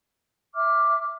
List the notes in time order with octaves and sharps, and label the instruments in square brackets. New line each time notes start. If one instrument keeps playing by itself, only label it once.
[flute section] E5 D6 F6